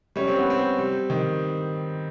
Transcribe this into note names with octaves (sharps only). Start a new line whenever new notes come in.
G3 C#4
C4
B3
G3 C4
G3
D#3